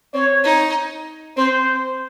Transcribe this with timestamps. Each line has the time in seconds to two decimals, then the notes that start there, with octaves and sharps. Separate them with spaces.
0.14 C4 C#5
0.44 D#4
1.37 C4 C5